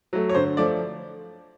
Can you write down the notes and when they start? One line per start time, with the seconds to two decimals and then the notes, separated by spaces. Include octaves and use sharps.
0.13 F#3 A3
0.29 C#5
0.34 D3 C5
0.57 F3 A3 D5